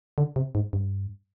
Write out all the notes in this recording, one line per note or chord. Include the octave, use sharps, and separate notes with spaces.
D3
C3
G#2
G2